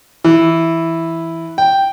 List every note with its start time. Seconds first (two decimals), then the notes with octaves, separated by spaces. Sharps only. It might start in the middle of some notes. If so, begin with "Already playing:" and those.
0.24 E3
1.58 G5